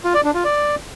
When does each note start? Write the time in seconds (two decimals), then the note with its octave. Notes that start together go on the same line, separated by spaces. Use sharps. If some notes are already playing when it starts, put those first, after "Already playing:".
0.04 F4
0.14 D5
0.24 D4
0.34 F4
0.44 D5